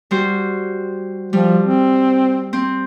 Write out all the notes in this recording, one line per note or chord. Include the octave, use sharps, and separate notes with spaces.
G3 F#4 C5
F3 G3
C4
C4